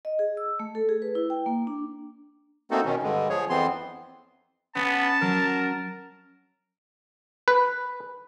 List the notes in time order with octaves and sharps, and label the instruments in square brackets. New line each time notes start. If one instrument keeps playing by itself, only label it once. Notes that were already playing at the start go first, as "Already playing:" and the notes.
[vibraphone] D#5
G#4
E6
A3
A4
G#4
B4
E4
G5
A#3
D4
[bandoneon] A3 A#3 C4 D#4 F#4 A4
B2 D#3 C#4
G2 D3 G#3
F3 G#4 C#5
F2 E3 B3 C4 C6
[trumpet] B3 [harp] C#4 [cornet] A5
[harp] F#3 [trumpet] A#4
[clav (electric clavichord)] B4